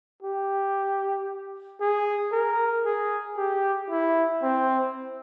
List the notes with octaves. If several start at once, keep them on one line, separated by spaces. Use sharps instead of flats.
G4
G#4
A#4
G#4
G4
E4
C4